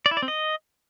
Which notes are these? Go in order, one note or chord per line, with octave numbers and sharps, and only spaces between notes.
D5
E4
D5
C4
D#5